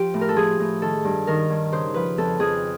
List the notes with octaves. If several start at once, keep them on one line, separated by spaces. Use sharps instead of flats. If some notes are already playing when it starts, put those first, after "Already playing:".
Already playing: F3 G4
A2
A#4
A4
F3 G#4
A2
D#3 A4
G2
D#3 A#4
G2
C#3 C5
F3 B4
F2 A4
F2 G#4